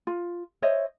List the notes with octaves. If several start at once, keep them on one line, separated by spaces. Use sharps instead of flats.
F4
C5 C#5 D#5 E5